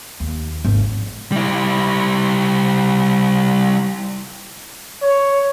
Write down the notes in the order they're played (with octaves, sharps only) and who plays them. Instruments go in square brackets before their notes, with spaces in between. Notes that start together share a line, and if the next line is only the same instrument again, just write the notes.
[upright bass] D#2
G#1
[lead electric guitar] G3 E4
[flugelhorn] C#5